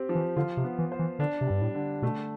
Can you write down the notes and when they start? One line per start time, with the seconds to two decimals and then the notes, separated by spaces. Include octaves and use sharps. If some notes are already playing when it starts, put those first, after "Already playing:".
Already playing: C4 G4
0.09 F3
0.15 E3
0.36 D3 F4
0.57 C3
0.64 B3
0.78 E3
0.92 C5
0.99 E3
1.19 D3 D4
1.41 C3
1.47 G2 G3
1.62 A2
1.74 D3
2.02 B2 A3